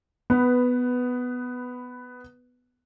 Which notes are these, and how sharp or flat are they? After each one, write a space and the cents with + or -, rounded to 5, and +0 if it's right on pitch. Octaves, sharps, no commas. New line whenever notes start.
B3 +10 B4 +0